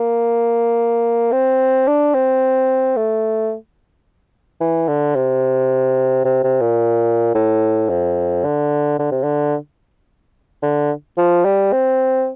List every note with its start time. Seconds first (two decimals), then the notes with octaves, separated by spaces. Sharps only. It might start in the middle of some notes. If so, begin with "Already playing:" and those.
Already playing: A#3
1.32 C4
1.87 D4
2.14 C4
2.96 A3
4.61 E3
4.88 D3
5.16 C3
6.25 C3
6.44 C3
6.61 A#2
7.35 A2
7.89 F2
8.44 D3
8.99 D3
9.11 C3
9.23 D3
10.63 D3
11.18 F3
11.45 G3
11.72 C4